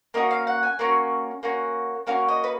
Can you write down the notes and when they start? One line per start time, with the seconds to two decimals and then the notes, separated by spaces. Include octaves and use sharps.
0.14 A#3 C#4 F#4 D#5
0.31 F5
0.47 F#5
0.63 G#5
0.79 A#3 C#4 F#4
1.43 A#3 C#4 F#4
2.07 A#3 C#4 F#4 F5
2.29 D#5
2.44 B4